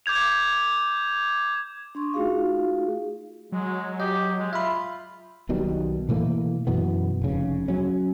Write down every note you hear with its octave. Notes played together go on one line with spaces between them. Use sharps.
D6 G6 G#6 F7
D4 C6 C#6
A3 D#4 F4 F#4 G#4 F5
F#3 G#3
G4 D#5
G#3
F4 E5 B5
B1 B2 D#3 G3
B2 E3 A3 A#3
F#2 B2 E3 B3
F1 C#3
F#3 C#4